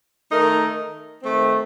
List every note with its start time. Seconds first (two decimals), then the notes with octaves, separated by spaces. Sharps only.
0.31 D#3 A3 D#4 A#4
1.21 D#3 A3 C4